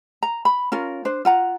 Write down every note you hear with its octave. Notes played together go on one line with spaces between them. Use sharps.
A#5
B5
C#4 F4 A#4
D4 C5
F4 F#5 A#5